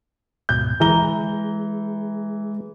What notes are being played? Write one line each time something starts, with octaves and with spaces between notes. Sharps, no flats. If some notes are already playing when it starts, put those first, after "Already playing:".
D2 G#2 B2 G6
E3 G#3 A#5 G7